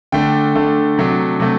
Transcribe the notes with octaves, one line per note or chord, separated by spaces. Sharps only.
D3 A3 D4 G5
D3 A3 D4
C3 F#3 A3 D4
C3 F#3 A3